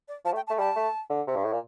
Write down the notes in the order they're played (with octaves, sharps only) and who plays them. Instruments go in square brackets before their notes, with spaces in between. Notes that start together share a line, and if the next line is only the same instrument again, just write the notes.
[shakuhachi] D5
[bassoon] F3 [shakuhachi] A5
[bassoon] A3
[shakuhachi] G5
A5
[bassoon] A3
[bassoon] G3 [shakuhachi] A5
[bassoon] A3
D3
C3
G2
A2
A#2